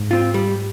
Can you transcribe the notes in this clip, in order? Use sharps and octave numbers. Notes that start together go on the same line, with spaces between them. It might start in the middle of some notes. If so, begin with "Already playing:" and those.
Already playing: G#2
C4 F4
G3